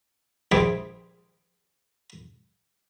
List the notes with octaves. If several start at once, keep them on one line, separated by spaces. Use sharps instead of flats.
A#1 G3 G#4 C5 E5 D6